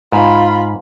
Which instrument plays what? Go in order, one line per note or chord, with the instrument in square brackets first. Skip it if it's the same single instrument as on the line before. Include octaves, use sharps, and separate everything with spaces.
[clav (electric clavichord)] G#2 [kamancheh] F4 B5